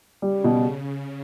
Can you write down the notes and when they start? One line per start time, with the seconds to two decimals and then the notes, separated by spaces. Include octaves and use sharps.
0.22 C#3 G3
0.44 B2